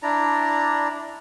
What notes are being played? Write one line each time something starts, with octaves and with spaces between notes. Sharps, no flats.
D4 E4 D5 A#5